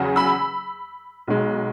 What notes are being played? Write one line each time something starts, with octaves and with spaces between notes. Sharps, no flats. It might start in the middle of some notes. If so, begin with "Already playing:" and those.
Already playing: E2 C#3 F#3
B5 E6
B1 B2 G#3